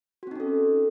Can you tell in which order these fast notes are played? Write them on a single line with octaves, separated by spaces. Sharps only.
F#4 C4 D#4 C#4 A4